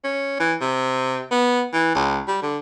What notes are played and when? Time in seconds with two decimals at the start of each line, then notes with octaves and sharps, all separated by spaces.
0.04 C#4
0.39 E3
0.61 C3
1.31 B3
1.74 E3
1.95 C#2
2.28 G3
2.42 D3